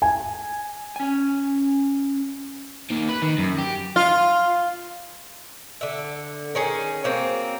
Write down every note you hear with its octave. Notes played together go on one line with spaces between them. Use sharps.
G#5
C#4 G#5
D#3 A#3
B4
D#3
F#2
G4
F4
D3 E5
D#3 C#4 G#4
F#3 A#3 C4